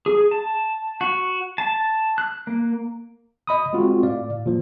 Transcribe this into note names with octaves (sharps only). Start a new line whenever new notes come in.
G#4
A5
F#4
A5
F#6
A#3
D#5 B5 D#6
G#3 C4 F4 F#4
A2 D5 F5
A#2 F3 A#3